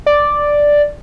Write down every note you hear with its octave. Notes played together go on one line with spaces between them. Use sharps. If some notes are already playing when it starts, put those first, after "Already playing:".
D5